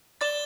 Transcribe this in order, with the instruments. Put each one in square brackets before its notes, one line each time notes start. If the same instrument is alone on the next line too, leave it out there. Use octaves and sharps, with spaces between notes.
[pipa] D5 [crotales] A6 E7 G7